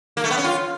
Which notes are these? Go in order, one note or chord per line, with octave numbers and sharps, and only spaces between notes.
A#3
A3
B3
C#4
F4